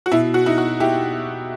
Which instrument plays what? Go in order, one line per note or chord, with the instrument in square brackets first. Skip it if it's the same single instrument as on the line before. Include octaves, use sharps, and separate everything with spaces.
[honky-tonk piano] F#4
[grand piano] B2 [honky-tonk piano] E4
[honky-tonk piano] F#4
[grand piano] D#4 [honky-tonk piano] E4
[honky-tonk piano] F#4
[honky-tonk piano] E4 [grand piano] G4